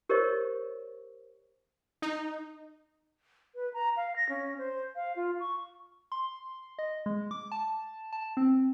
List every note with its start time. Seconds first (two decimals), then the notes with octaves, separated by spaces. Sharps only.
0.09 G4 A#4 C5 C#5 D#5 C#6
2.02 D#4
3.55 B4
3.74 A#5
3.96 F5
4.16 A#6
4.29 C#4
4.58 C5
4.96 F5
5.16 F4
5.40 C#6
6.12 C6
6.79 D#5
7.06 G#3
7.31 D6
7.52 A5
8.13 A5
8.37 C4